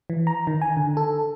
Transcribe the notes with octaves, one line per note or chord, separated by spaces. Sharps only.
E3
A#5
D#3
G#5
D3
A4